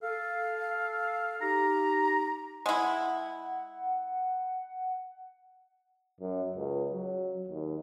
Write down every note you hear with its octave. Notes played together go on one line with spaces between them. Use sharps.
A4 F5
D#4 G4 A#5
G#3 E4 F#5
F#2
C#2
F#3
D#2